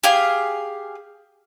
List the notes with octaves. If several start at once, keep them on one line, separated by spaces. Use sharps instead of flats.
G4 G#4 F5